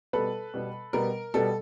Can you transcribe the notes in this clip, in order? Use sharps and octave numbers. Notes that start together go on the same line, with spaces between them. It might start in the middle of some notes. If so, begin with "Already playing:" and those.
B2 G3 B3 A4 B4
B2 G3 B3
B2 G3 B3 A#4
B2 G3 B3 A4